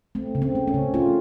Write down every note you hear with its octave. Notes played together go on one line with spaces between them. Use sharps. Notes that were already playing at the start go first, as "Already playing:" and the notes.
A3 C4
C#3
C4
A3
C#4
C#3
A3 F4